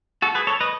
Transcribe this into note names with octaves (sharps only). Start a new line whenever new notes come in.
F#4 A4
G#4 B4
A4 C#5
B4 D#5